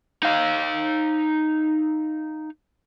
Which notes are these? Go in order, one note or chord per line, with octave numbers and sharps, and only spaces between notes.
D#4 F5